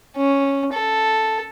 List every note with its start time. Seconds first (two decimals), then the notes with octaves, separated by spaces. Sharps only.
0.17 C#4
0.73 A4